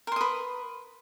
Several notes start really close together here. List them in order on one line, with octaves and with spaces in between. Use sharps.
A#4 C6 D#6 B4